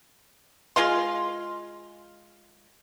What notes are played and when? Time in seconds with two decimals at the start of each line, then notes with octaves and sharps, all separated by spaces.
0.76 G#3 F4 F5 C6